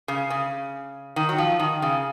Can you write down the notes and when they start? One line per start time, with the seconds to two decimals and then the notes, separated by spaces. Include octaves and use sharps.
0.08 C#3
0.30 C#3
1.16 D#3
1.29 F#3
1.38 F3
1.60 D#3
1.82 C#3